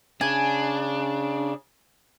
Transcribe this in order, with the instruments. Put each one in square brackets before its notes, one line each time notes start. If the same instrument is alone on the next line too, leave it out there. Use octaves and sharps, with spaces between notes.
[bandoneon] C#3 [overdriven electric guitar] D4 [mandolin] G#5